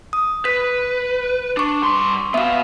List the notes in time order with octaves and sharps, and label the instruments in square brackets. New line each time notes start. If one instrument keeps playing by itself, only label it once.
[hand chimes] D#6
[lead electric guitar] B4 [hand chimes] B6
[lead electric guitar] D4 [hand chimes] C#6 D6
[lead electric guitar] G2 C6
[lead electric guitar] B3 F#4 [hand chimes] E5 F5